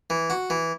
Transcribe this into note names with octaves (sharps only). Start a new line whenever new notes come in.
E3
F#4
E3